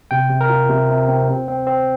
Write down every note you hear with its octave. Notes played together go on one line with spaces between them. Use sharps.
C3 G5
C3
A#4
F4
C3
C3
C4
C4
C4
C4